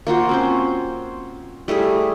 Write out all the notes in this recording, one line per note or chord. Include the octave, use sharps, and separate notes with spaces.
A#3 F4 F#4 C5
C4 C#4 C5
G3 A3 E4 G#4